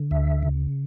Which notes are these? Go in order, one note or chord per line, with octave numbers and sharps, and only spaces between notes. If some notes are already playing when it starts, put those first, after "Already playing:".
Already playing: D3
D2 E5
C#3